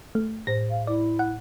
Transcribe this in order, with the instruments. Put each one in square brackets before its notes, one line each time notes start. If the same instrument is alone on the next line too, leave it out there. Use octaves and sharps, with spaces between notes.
[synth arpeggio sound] A3
[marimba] A2 C5 [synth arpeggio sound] A#6
[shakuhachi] F5
[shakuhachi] E4 [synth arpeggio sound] D5
[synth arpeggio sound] F#5